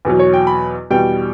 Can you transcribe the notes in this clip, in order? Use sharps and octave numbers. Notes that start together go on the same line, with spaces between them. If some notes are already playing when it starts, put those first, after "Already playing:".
E2 B2 F#3
C#5
G5
B5
E2 B2 G3 G5